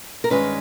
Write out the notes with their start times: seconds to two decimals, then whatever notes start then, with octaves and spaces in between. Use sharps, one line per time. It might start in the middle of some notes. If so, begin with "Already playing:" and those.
0.24 A#4
0.30 G2 D#3 G#3 C#4 B4